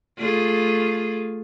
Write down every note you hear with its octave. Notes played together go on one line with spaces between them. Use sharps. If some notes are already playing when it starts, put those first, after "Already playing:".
A3 F4 G#4